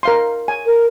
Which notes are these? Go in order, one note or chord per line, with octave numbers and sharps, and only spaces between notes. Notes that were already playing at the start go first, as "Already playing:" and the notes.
A#4 F5 C6
G#5
A#4